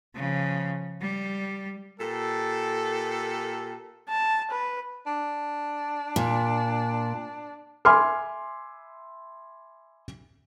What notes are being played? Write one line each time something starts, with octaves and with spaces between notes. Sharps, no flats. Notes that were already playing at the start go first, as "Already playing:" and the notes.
C#3 F3
G3
A#2 G4 A4
A5
B4
D4
A#2
E5 G#5 B5 C6 D6 F6